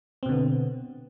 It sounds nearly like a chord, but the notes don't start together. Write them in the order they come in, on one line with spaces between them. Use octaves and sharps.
C4 B2 D3 B3